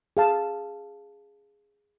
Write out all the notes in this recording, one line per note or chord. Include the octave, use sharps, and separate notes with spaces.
G#4 F5 A5